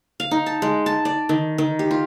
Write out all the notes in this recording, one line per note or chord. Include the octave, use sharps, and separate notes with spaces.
F5
D#4
A5
G#3
A5
D5
D#3
D#3
G4
F4